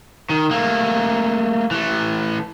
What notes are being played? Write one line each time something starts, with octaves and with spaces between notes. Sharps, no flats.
D#3
A3 A#3
E3 A3